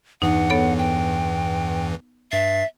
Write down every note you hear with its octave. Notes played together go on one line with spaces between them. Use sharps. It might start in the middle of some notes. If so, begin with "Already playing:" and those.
E2 G2 E3 D#4 F#5
B3 A4 C#5
G5
G2 E5 A6 C7